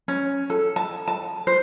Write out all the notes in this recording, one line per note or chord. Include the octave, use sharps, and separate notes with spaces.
C#4
A4
A5
A5
C5